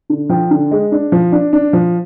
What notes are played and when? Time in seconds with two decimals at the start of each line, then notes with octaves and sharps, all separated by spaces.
0.10 D3
0.29 F3 G5
0.51 D3
0.71 G#3
0.92 D4
1.12 F3
1.32 D4
1.53 D4
1.73 F3